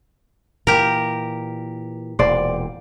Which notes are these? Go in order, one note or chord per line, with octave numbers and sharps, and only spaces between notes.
A#2 E3 G4 A#4
E1 A#2 E3 C5 D5